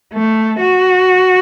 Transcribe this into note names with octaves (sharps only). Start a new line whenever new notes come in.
A3
F#4